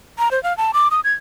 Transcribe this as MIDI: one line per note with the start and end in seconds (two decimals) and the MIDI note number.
0.19 0.31 82
0.31 0.42 72
0.43 0.56 77
0.57 0.71 81
0.74 0.88 86
0.91 1.00 87
1.04 1.13 92